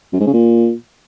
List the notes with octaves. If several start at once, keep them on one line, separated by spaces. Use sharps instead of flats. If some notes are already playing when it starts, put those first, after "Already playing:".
F#2
G#2
C#3
A#2